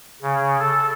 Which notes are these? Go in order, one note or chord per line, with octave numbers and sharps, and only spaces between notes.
C#3
A4